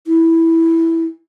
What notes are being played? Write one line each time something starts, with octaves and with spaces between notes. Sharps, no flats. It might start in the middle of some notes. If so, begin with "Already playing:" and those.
E4